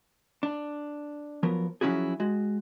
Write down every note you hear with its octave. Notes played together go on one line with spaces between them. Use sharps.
D4
F3 F#3 B3 A#4
F3 F#3 C#4 E4 F#4 G#4
G#3 F#4